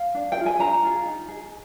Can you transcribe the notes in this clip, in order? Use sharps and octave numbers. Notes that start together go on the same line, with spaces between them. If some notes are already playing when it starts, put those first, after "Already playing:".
Already playing: F5
D4
G5
F4 G#4
G#5
D4 A#5
F4 G#4
D#4
G#4